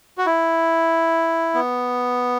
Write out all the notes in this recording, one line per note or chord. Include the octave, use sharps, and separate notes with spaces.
F#4
E4
B3